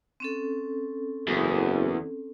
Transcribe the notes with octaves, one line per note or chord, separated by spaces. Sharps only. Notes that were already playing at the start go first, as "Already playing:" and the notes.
C4 C#4 A4
F#1 E2